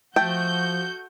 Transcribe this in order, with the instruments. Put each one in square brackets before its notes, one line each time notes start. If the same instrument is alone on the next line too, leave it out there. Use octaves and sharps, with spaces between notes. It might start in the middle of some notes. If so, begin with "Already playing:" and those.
[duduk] F3 [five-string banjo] A3 G5 [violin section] F#4 G6